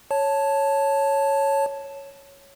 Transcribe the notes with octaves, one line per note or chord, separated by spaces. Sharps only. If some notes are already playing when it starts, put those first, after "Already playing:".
C#5 A5